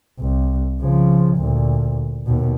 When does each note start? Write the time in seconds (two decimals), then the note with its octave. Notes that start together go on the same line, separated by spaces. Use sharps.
0.19 C2
0.82 C#3 F3
1.37 D2 A#2
2.26 D#2 B2